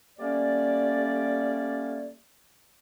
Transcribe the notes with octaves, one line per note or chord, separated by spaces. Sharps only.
G3 A3 A#3 C#4 D5